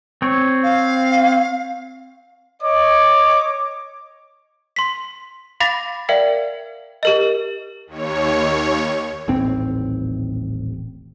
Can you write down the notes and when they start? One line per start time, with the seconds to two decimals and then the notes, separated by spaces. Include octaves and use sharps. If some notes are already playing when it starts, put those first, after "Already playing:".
0.22 C4 C#5
0.63 F5
2.62 C#5 D#5 D6
4.76 C6 B6
5.60 F5 B5 D6 A6 A#6
6.09 A#4 D5 E5 F5 G5
7.03 G4 A#4 D#5
7.87 D#2 C#5
9.28 D#1 A1 C4